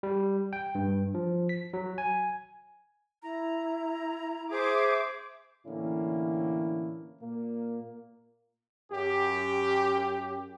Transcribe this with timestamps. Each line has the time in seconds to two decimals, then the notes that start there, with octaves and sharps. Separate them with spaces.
0.03 G3
0.53 G5
0.75 G2
1.14 F3
1.49 B6
1.73 F#3
1.98 G#5
3.23 E4 A#5
4.52 G#4 C5 E5 D6
5.67 A2 D3 E3 A#3 C#4 E4
7.22 A#2 A#3
8.92 F#2 G4